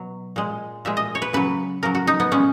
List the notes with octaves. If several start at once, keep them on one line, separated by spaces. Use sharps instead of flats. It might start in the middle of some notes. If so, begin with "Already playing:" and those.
Already playing: B2 F#3
A#2 G#3
A#2 G#3 E5
D#5
C#5
B4
C#3 F#3 B4
C#3 F#3 A#4
F#4
D#4
B3
A#2 G#3 C#4